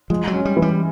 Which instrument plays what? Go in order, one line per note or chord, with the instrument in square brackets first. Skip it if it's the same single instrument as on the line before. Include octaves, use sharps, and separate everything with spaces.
[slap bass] F3 [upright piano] G#3
[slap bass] F#3
[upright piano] C#4
[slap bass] G3
[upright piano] E3
[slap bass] G3